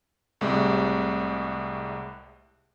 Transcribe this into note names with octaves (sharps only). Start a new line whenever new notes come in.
C2 A2 C3 G#3